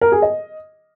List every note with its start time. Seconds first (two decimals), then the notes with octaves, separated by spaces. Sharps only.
0.01 A#4
0.12 G#4
0.22 D#5